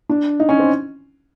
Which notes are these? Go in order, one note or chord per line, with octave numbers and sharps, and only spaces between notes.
D4
D#4
C#4
C4